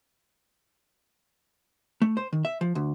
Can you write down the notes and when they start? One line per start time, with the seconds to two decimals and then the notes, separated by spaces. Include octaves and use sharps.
2.02 A3
2.17 C5
2.33 D#3
2.45 E5
2.61 F3
2.75 D2